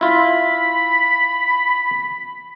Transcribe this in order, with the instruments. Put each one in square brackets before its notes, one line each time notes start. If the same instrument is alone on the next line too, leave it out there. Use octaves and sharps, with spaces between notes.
[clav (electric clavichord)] E4 F4 [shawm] B5